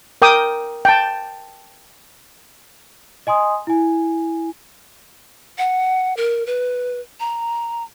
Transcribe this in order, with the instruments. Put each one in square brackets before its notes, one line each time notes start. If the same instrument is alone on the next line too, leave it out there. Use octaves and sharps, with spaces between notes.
[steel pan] A#4 G5 D6 D#6
G5 A5
[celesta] D#5 G#5 C6 D#6
E4 G#5
[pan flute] F#5
A#4
B4
A#5